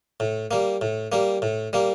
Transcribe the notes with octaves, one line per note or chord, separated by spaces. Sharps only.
A2
G3 A#3
A2
G3 A#3
A2
G3 A#3